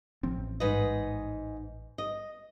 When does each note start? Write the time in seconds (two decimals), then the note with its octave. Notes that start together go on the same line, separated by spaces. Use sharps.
0.23 A1 F3 C4
0.60 G#2 B4 D#5
1.98 D#5